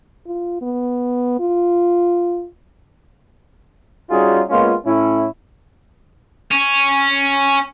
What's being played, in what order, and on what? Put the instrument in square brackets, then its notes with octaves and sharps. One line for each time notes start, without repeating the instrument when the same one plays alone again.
[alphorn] F4
B3
F4
[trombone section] G3 C#4 D#4 F4 F#4 G#4
G#3 A#3 B3 C#4 F4
A2 C#4 E4
[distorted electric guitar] C#4